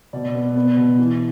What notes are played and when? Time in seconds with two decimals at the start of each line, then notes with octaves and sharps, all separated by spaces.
0.13 B2 D5
0.35 B3
0.56 B3
0.77 B2
0.99 E3